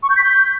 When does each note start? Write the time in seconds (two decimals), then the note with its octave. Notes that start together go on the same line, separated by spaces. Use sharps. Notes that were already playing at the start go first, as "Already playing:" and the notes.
0.03 C#6
0.10 G6
0.17 B6
0.23 G6